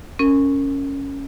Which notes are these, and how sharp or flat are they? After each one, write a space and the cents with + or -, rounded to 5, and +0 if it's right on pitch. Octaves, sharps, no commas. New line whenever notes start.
C#4 +0 A#4 -25